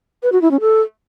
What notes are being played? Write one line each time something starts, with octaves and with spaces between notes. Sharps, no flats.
B4
F#4
E4
C#4
A4